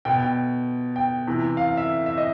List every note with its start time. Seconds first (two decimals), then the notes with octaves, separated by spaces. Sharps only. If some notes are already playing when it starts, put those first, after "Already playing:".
0.05 B2 G5
0.20 G5
0.96 G5
1.27 C3 E3
1.57 F5
1.68 F5
1.77 E5
2.06 E5
2.18 D#5